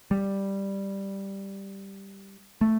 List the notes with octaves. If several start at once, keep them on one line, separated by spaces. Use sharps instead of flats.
G3
A3